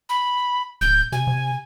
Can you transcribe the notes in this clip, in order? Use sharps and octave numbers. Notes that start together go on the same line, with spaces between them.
B5
D1 G6
C3 G#5
C3